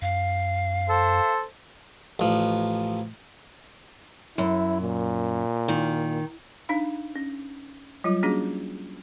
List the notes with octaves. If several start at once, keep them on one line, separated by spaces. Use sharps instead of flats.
F#2 F5
A4 C5
A1 F3
F#2 E4
A#2
D#3
D4 D#4 F5 B5
C#4
F#3 G3 F4
A#3 C#4 D4 F#4 G#4